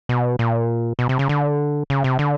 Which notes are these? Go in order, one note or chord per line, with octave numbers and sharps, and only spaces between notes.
B2
A#2
B2
C3
C#3
D3
C#3
C3
D3